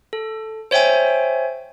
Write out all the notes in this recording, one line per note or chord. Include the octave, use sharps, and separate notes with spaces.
A4
C5 C#5 E5 G5 G#5